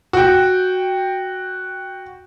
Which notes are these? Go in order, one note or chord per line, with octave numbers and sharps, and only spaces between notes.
F#4 G5